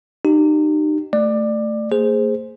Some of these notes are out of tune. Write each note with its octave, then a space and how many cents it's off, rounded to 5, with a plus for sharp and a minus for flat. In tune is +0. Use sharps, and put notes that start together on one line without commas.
D#4 -30 G4 -20
A3 +10 D5 +20
A#3 -40 G#4 +0 C5 +0